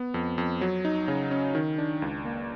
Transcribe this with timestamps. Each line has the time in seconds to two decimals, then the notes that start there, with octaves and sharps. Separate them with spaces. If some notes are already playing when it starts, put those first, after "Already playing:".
Already playing: B3
0.14 F2
0.38 F2
0.61 F#3
0.85 D#4
1.08 C#3
1.31 C#4
1.55 D#3
1.78 D4
2.02 C#2
2.25 A#3